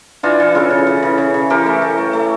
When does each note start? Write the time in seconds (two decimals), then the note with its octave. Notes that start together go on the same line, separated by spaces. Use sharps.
0.23 E3 D4 F4
0.40 E3
0.55 C#3 F4 A4
0.70 C#3
0.87 C#3
1.03 C#3
1.18 C#3
1.34 C#3
1.50 E3 G4 A#4
1.66 A3
1.82 A3
1.98 A3
2.13 A3